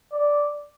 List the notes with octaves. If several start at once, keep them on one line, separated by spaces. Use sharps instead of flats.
D5